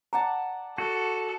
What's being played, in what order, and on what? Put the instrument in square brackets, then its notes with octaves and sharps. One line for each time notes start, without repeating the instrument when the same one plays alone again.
[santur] D5 F#5 A5 [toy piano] A#5
[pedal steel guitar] F#4 [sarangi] A4